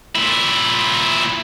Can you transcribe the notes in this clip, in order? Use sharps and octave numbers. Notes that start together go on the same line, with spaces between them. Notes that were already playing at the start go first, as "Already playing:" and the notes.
A#2 E4